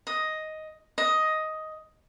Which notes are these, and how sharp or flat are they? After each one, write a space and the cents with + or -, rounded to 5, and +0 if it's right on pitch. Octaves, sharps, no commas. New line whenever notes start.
D#5 +5
D#5 +10